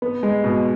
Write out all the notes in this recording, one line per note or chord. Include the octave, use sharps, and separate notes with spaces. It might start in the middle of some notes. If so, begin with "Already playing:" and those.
B3
G#3
B2